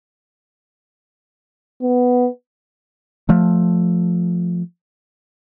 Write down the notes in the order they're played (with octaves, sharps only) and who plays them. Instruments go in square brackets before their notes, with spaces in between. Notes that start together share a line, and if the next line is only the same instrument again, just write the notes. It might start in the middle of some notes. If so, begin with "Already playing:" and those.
[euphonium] B3
[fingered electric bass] F3 A3